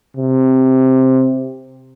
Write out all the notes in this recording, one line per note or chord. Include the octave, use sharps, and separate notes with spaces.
C3